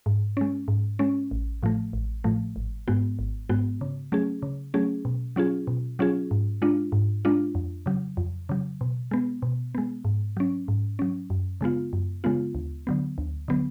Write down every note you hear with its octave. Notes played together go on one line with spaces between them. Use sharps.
G#2
G#3 C#4
G#2
G#3 C#4
A1
A2 F3 A3
A1
A2 F3 A3
G#1
G#2 G#3 B3 F#4
G#1
G#2 G#3 B3 F#4
C#3
F#3 A3 C#4 G#4
C#3
F#3 A3 C#4 G#4
B2
F#3 C#4 F4 G#4
B2
F#3 C#4 F4 G#4
G#2
G#3 D4 F4
G#2
G#3 D4 F4
F2
C#3 F#3
F2
C#3 F#3
B2
G#3 B3
B2
G#3 B3
G#2
F#3 C#4
G#2
F#3 C#4
F#2
C#3 G#3 B3 F4
F#2
C#3 G#3 B3 F4
D2
D3 F#3 B3
D2
D3 F#3 B3